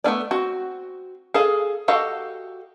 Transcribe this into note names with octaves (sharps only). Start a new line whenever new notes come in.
A3 B3 C#4 D5
C4 F#4
G#4 A4 F5
F#4 G4 A4 D#5 F5